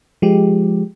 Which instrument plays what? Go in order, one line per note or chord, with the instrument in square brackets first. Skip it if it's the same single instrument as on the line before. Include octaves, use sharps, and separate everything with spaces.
[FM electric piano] F3 G#3 G4